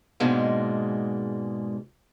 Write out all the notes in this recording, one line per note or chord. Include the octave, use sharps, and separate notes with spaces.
G#2 B2 G#3 A#3 D4